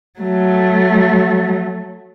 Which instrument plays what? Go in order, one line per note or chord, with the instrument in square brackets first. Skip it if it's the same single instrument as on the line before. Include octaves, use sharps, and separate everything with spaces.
[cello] F#3 A3